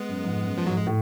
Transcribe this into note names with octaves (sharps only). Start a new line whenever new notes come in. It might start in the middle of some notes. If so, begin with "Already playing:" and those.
Already playing: G#3 B3
F#2
F2 G#2
F#2
F3
F2 G#2 F#3
G#3
A2